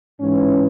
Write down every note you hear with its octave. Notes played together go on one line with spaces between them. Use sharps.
G#2 E3 C#4